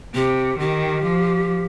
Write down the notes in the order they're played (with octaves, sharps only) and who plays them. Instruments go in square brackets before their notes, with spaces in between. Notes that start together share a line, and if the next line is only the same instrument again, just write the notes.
[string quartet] C3 [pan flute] G4
[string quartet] D#3 [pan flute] G4
[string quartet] F3